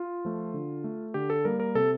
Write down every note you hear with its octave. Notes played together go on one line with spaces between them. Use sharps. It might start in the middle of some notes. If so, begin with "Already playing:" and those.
Already playing: F4
F3 A3
D3
A3
D3 G4
A4
G3 A#3 A#4
A#4
C3 A4